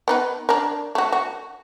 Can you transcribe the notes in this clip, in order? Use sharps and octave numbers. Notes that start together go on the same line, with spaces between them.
B3 D#4 B4
D4 A#4
A3 F#4
F#4